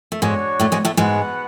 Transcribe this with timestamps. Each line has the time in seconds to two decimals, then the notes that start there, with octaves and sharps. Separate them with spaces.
0.12 A3
0.22 G#2 G#3 D4 F#4 C#5
0.60 A2 A3
0.72 G#2 G#3
0.85 A2 A3
0.97 G#2 G#3 B3 F#4 B4 F#5